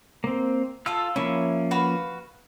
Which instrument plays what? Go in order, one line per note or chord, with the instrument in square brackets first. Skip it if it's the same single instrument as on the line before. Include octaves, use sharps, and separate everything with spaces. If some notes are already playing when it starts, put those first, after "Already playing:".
[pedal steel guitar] A#3 C4
[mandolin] F4 A4 [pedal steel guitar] F5 E6 F6
[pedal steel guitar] F3 A#3 C#4 [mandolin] E4
[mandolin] F#4 B4 F5